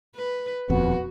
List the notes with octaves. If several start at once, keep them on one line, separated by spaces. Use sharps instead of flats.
B4
D#1 F2 B3 F#4